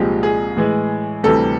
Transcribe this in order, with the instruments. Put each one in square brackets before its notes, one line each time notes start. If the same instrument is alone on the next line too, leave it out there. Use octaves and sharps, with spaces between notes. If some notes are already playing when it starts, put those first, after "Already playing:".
Already playing: [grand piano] C2 A#2 F3 G#3 G4
G#4
A2 E3 G#3
D2 C3 E3 G3 A4